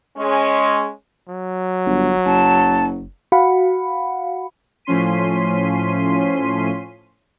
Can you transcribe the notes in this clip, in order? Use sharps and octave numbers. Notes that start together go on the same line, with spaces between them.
G#3 C#4
F#3
G1
F#1 A5
F#4 F5 F#5 B5
A2 F3 C#4 C6 B6 D#7